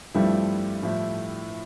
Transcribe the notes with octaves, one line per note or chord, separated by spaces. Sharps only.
G2 F3 G3 A3 C4 E4
A2 F3 A3 E4